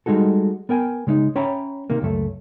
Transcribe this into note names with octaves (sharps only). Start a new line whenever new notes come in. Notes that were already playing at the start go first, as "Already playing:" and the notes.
G3 G#3 D#4 F#4 A4
B3 A#4 G5 G#5
C#3 G#3 C#4 D#4
C#4 C#5 E5 G5 A#5 B5
C3 D#3 A#3
C#2 F#2 A3